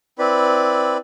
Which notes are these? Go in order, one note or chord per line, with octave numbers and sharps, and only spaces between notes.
C4 E4 B4 D5 B5